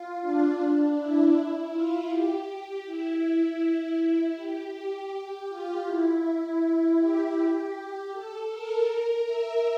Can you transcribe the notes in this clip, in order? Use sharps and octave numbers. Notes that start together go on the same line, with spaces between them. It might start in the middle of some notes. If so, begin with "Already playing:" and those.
Already playing: F4
D4
D4
E4
F4
G4
E4
E4
G4
G4
F4
E4
E4
E4
G4
G4
A4
A#4
A#4
E5